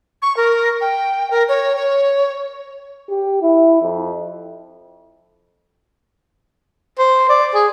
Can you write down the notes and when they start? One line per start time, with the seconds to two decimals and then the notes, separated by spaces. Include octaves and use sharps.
0.22 C#6
0.36 A#4
0.80 G5
1.30 A#4
1.48 C#5
1.76 C#5
3.09 G4
3.42 E4
3.82 F2
6.98 C5
7.29 D5
7.54 G#4